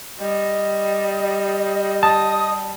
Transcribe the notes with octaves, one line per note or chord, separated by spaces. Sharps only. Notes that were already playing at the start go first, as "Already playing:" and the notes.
G3 D#5
A5 D#6